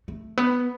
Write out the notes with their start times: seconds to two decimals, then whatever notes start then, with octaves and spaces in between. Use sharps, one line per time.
0.08 A3
0.38 B3